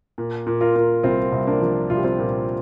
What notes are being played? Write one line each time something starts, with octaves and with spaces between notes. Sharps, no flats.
A#2
A#2
F4 A#4
A#2
C2 C4 F4
C2
A#3 D4
F3
C2 F4
G4
C4 F4
A#2